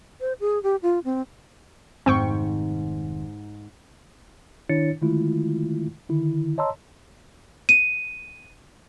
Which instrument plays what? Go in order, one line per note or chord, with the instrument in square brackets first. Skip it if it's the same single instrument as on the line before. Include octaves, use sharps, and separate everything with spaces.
[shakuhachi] C5
G#4
G4
F4
C4
[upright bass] F1 D#3 [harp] G#2 [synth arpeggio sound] C4 G5 C#6
[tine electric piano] D#3 D4 E4 C#5 A6 C#7
D3 D#3 G#3 A3 E4 F4
D3 D#3 E4
C#5 D#5 A5 A#5 C6 E6
[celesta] D#7